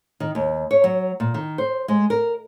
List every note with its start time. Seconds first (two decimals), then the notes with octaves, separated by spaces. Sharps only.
0.20 D#3
0.35 D#2
0.71 C#5
0.84 F#3
1.20 A#2
1.34 D#3
1.58 C5
1.88 G#3
2.10 A#4